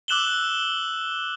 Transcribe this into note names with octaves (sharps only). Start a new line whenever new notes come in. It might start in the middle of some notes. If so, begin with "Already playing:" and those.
D6 E6 F#6 E7 F#7 G7